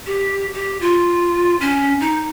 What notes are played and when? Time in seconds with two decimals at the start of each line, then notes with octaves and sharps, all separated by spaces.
0.06 G4
0.54 G4
0.81 F4
1.61 C#4
2.00 D#4